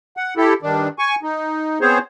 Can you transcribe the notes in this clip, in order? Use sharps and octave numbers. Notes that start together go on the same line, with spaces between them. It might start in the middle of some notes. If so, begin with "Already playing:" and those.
F#5
E4 G4 A4
G2 D#3 D4
G#5 C#6
D#4
B3 C4 G#4 C5 C#5